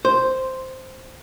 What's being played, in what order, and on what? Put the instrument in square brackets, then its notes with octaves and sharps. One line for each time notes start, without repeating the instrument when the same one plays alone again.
[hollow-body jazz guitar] C5